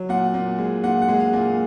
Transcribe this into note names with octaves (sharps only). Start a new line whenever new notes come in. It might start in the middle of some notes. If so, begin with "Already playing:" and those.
Already playing: F#3
A#2 F#5
A#2
G#3
A#2 F#5
F#5
G#3
F5
A#2